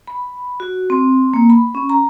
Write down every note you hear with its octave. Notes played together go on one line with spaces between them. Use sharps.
B5
F#4
C4
A#3
B5
C#4
A#5